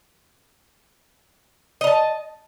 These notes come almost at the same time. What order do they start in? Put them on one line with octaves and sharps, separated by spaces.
D#5 A#5 A5